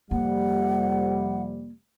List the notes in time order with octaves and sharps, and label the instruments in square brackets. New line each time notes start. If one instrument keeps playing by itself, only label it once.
[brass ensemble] F2 C3 G3 [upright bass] A#3 [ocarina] F#5